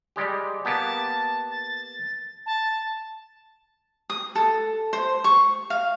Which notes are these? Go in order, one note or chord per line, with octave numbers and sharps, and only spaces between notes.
G3 G#3 G4
A#3 B3 G4 A5
A6
A5
D#6
A4
C5
C#6
F5